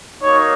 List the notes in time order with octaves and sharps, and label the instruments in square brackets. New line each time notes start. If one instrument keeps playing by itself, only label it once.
[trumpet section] A#3 D#4 F#4 C#5